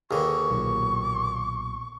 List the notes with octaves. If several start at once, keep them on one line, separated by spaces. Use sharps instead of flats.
D#2 D3 G#4 B4 C#6
B1 A#2